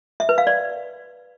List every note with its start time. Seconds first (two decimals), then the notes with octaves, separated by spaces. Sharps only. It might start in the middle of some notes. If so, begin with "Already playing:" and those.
0.20 E5
0.29 B4
0.38 F5
0.47 D5